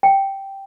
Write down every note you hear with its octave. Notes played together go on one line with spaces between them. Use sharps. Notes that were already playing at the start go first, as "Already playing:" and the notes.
G5